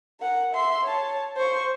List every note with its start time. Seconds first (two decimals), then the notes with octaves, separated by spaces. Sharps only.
0.20 A#4 F#5
0.53 E5 C6
0.85 C#5 A5
1.37 C5 C#6